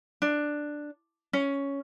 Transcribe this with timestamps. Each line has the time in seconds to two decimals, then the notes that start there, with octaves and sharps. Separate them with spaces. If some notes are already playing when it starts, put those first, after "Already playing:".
0.22 D4
1.33 C#4